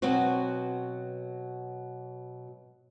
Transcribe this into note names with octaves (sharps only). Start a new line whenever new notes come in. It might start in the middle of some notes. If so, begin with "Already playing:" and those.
B2 F#3 B3 C4 F#4